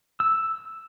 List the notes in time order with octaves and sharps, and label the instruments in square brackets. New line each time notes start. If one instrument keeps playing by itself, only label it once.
[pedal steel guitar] E6